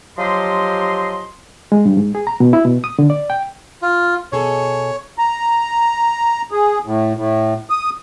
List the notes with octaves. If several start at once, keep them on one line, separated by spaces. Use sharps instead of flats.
F3 F#3 G4 D#5 C6
G#3
G2
G#2
G#4
A#5
B2
E4
B2
D#6
D3
D5
G5
F4
B2 G#4 A4 C#5
A#5
G#4
A2
A2
D#6